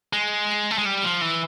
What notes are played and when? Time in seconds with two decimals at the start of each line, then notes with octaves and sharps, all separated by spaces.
0.13 G#3
0.71 A3
0.78 G#3
0.86 G3
1.04 F3
1.21 E3